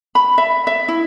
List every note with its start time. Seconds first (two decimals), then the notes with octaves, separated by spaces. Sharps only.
0.15 B5
0.38 E5
0.67 E5
0.88 E4